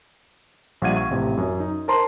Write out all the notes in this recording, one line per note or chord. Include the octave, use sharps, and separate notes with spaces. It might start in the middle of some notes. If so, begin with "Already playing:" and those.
A#1 G3 F5 F#5 G#6 D#7
C#6
A1 C3
F#2
D#4
A#4 C5 A5 A#5 C6